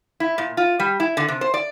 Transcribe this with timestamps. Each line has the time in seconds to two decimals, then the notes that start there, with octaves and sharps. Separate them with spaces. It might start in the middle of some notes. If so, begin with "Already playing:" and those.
0.20 E4
0.38 A#2
0.57 F4
0.80 G3
1.00 E4
1.17 D3
1.28 C3
1.41 C5
1.54 D5